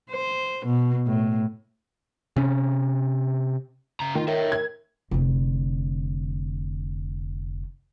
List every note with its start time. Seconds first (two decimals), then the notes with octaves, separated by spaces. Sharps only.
0.10 C5
0.66 B2
1.06 A2
2.37 C3 C#4
4.00 C#3 A#5
4.15 D#3 F4
4.28 A#4 C#5 E5
4.52 G#6
5.11 F1 D3